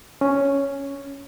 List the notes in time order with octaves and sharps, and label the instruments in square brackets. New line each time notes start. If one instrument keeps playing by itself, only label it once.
[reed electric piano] C#4